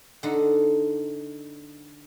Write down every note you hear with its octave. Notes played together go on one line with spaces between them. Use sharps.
D3 D#4